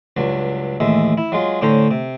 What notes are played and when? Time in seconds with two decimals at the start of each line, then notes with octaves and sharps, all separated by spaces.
0.17 C#2 G2 F#3
0.80 A1 D#2 G#3 E5
1.17 E4
1.32 F#3 G#3 F4
1.61 A2 D3 C#4 C5 A#5
1.91 C3